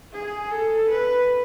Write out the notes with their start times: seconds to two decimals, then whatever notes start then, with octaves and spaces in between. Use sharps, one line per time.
0.13 G#4
0.51 A4
0.90 B4